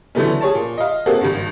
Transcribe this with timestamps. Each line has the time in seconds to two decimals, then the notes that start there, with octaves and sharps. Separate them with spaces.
0.15 D3 E3 F#3 A3 B3 C#4
0.41 G#4 C#5 A5
0.55 A#2
0.78 D#5 F5
1.06 A#3 C4 F#4 G#4 A4
1.21 G#1 G2